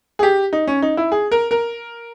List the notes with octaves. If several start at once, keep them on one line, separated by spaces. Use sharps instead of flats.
G#4
G4
D#4
C#4
D#4
E4
G#4
A#4
A#4